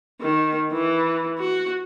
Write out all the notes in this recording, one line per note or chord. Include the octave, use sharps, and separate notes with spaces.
D#3
E3
F#4